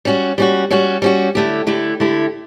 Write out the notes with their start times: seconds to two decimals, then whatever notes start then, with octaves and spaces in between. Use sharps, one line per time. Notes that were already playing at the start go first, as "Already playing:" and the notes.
0.05 G3 C#4 F#4
0.38 G3 C#4 F#4
0.71 G3 C#4 F#4
1.02 G3 C#4 F#4
1.35 D3 A3 E4 G4
1.67 D3 A3 E4 G4
2.00 D3 A3 E4 G4